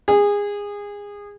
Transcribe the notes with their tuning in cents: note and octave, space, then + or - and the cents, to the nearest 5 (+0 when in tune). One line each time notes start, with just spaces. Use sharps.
G#4 -25